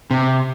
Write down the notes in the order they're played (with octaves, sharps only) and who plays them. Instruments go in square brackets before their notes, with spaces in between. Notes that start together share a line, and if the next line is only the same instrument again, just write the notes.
[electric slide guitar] C3